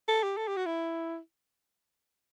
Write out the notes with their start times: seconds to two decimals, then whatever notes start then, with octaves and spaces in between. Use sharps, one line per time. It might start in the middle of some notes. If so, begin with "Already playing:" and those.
0.08 A4
0.23 G4
0.37 A4
0.47 G4
0.56 F#4
0.66 E4